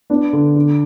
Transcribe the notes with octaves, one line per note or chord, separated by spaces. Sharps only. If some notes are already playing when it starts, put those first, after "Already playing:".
B3 D4
D3
D3